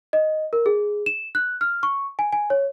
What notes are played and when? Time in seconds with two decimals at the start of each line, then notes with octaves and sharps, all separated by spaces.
0.13 D#5
0.53 A#4
0.66 G#4
1.06 E7
1.35 F#6
1.61 F6
1.83 C#6
2.19 G#5
2.33 G#5
2.50 C#5